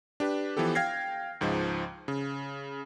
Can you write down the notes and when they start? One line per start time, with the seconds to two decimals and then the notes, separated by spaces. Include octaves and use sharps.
0.20 D4 G4 B4
0.57 E3 F3 B3 G4 A4
0.75 F5 G5 F6 G#6 A#6 C7
1.41 C#2 G#2 F3 D#4
2.08 C#3